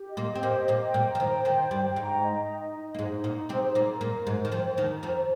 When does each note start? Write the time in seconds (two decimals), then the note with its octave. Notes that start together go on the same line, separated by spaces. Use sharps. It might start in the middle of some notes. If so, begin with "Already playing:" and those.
Already playing: G4
0.11 D#5
0.17 A#2 A#3
0.30 G4
0.35 C4
0.43 A#2 A#3
0.50 D#5
0.68 A#2 A#3 C5
0.87 G5
0.94 A#2 A#3
1.07 A#5
1.15 F3
1.20 D#2 D#3
1.26 G5
1.45 D#2 D#3 C5
1.64 G5
1.71 G2 G3
1.84 G5
1.96 G#2 G#3
2.03 A#5
2.23 D#5
2.41 D#4
2.60 D#5
2.80 D#4
2.95 A#3
2.99 G#2 G#3 D#4
3.18 D#4
3.24 A#2 A#3
3.37 D#4
3.49 C3 C4
3.56 G#4
3.75 A#2 A#3 A#5
3.94 A#4
4.01 A#2 A#3
4.14 A#4
4.27 G#2 G#3
4.32 A#4
4.45 D#3
4.52 F2 F3 G5
4.71 A#4
4.77 D#2 D#3
4.91 A#5
5.03 F2 F3
5.09 A#5